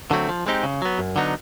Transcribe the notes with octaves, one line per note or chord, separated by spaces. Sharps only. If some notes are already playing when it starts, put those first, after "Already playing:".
D3 F#3 A3 C4
F3
G#3 C4 D#4 G4
C#3
F#3 B3
F#2
D3 F#3 B3 D#4